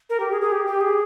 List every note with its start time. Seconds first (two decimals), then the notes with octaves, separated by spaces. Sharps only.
0.10 A#4
0.20 G4
0.31 G#4
0.41 G#4
0.52 G4
0.66 G4
0.81 G#4